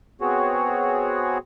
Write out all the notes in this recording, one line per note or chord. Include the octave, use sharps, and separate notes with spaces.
B3 C4 F#4 G#4 C#5